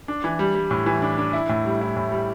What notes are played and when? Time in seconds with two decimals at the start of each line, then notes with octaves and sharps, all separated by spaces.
0.08 D4
0.24 E3
0.39 G3
0.55 G3
0.71 A2
0.86 E3
1.02 D4
1.18 D4
1.33 E4
1.49 A2
1.65 G3
1.81 E4
1.96 A2
2.12 G3